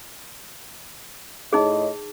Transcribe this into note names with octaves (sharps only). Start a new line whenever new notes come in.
A2 D#4 G#4 C#5 D#5